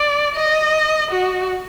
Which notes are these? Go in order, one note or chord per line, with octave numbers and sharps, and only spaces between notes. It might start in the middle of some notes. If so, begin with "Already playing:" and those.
Already playing: D5
D#5
F#4